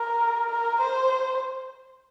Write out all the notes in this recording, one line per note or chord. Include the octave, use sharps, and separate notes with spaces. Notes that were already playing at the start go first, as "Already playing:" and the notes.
Already playing: A#4
A#4
C5